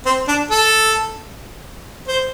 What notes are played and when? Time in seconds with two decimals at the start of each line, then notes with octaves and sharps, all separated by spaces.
0.05 C4
0.28 D4
0.50 A4
2.08 C5